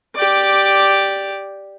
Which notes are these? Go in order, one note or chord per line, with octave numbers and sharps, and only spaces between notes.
G4 D5